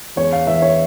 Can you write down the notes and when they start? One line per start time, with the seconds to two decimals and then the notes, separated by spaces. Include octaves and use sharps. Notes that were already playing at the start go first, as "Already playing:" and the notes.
0.16 E2 C#5
0.32 F5
0.47 E3 E5
0.62 C#5